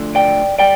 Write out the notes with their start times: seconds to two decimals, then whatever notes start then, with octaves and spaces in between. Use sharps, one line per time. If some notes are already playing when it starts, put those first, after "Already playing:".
Already playing: D2 D3 F3
0.15 D5 G5
0.59 G3 D5 G5